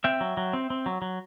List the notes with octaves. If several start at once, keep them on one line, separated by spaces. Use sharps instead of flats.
C4 E5 G5
F#3
F#3
C4
C4
F#3
F#3